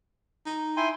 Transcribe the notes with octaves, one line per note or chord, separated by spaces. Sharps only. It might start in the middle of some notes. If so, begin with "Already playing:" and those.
D#4
E4 G5 G#5 C6